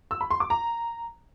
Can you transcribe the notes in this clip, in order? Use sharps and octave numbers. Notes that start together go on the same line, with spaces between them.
E6
B5
C6
D6
A#5